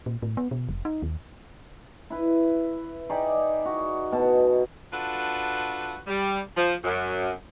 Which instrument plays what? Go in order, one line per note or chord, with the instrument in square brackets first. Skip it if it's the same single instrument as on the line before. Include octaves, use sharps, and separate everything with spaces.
[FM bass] A#2
A2
B3
B2
F1
D#4
D#2
[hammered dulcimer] E4 B4
D#4 G4 G#4 D5
F#4
B2 A5
[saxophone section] D4 F4 F#4 A4 B4
G3
F3
F#2